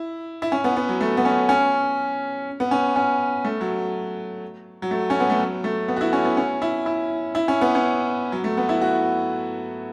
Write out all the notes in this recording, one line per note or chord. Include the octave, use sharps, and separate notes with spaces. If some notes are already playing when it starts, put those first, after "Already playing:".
Already playing: E4
E4
C#4
B3
B3
F#3
A3
B3
C#4
C#4
B3
C#4
C#4
A3
F#3
F#3
A3
C#4
B3
A3
F#3
A3
B3
F#4
E4
C#4
B3
C#4
E4
E4
E4
C#4
B3
C#4
F#3
A3
B3
E4
F#4